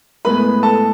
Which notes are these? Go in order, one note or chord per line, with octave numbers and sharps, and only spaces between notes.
A2 G#3 B3 B4 B5
A4 A5